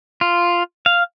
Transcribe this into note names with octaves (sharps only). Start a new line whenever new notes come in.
F4
F5